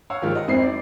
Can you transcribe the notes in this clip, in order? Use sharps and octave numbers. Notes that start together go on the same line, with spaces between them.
C#5 F5 F#5 E6
G#2 D#3 F3 D#4 F4 G4
D#5 F#5
G#1 F2 C4 E4 C7
D#4 D5